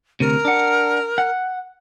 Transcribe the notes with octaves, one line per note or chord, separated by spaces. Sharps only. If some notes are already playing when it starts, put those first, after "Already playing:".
D2 C3 A#4
D4 F#5
F#5